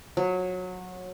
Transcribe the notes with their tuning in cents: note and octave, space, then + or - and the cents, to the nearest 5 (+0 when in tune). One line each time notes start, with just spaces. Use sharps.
F#3 -20